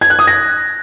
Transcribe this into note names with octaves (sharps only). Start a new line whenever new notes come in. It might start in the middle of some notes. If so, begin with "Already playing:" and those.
G#6
F#6
D#6
A#6